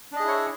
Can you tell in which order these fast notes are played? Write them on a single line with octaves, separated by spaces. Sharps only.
D4 D#5 G#4 E4 C#5